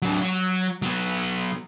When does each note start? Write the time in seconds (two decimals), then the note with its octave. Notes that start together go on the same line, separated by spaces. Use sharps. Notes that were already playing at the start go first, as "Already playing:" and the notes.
0.02 F#3 D4
0.21 F#3
0.82 F#3 B3